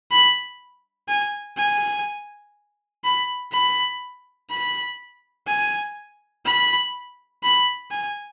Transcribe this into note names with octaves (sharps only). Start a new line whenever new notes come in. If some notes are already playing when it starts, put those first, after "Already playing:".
B5
G#5
G#5
B5
B5
B5
G#5
B5
B5
G#5